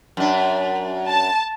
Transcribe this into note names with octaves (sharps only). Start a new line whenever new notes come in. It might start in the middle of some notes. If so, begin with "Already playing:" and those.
F#2 D4
A5